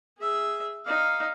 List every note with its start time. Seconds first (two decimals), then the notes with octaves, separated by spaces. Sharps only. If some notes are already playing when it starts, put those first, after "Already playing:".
0.18 G#4 E5
0.85 D#4 F5